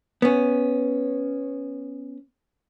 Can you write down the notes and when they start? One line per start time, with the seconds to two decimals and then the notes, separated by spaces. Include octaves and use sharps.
0.22 B3 C#4